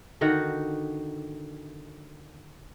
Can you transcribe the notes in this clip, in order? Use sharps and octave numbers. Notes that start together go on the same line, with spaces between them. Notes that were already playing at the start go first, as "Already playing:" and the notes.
D3 D#3 D#4 F#4